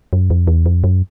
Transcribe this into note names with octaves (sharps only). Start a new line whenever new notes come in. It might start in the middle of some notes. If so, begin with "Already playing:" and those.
F#2
F2
E2
F2
F#2